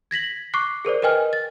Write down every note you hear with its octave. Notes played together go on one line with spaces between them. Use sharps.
G#6 A#6 B6 F#7
C#6 D6 F#6 C7
G#4 A#4 C5 D5
A#4 B4 D#5 G5 G#5 F6
A6